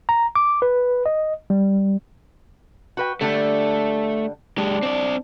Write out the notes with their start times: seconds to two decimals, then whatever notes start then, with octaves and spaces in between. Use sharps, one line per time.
0.09 A#5
0.35 D6
0.62 B4
1.06 D#5
1.50 G3
2.97 F#4 B4 G5
3.21 D3 G3 A3 D4
4.58 G#3 D4 G4
4.83 C4 D5